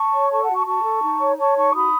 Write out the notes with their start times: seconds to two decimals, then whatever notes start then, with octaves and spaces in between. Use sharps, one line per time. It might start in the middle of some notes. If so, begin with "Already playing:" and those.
Already playing: A5 C#6
0.12 C#5
0.30 A4 A5 C#6
0.42 F#5 A5
0.48 F#4
0.54 A5 C#6
0.65 F#4 A5 C#6
0.83 A4
1.01 D#4
1.19 C#5
1.37 C#5 A5 C#6
1.55 D#4 A5 C#6
1.73 F#4 B5 D#6